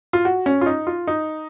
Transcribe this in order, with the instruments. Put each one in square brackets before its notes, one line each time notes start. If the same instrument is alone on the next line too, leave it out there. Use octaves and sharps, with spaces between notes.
[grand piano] F4
F#4
C#4
F4
D#4
F4
D#4